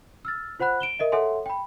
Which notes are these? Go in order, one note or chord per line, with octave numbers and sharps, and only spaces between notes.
E6 F6 A6
F4 C5 F#5 B5 F#6
D7 E7 G7
A#4 D#5 E5
A4 C#5 E5 F#5 G#5 C6
G5 B5